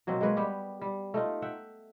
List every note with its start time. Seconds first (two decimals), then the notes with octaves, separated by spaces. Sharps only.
0.07 B2 F#3 A#3 C4
0.21 G#3 A#3 B4 C#5
0.37 G3 B3 G4
0.82 G3
1.14 A3 D#4 F4
1.42 E5 F#5 G5